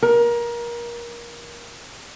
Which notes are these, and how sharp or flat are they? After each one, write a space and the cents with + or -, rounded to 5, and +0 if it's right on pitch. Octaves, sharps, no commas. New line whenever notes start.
A#4 +25